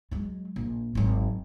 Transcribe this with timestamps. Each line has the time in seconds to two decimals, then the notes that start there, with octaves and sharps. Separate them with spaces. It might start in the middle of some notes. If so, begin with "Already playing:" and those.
0.11 F#3 G#3
0.56 A#1
0.95 G#1 F#3